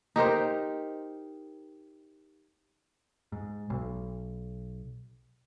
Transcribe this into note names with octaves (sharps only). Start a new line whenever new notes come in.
D#4 G4 A#4 C5
G#2
B1